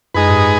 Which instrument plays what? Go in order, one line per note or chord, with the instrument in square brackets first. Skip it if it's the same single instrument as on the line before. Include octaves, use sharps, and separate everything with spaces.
[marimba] F#2 [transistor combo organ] G#3 D#4 G#4 B4
[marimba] G#2